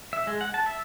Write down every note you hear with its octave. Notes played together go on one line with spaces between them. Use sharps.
E5
G#3
F#5
A5
E5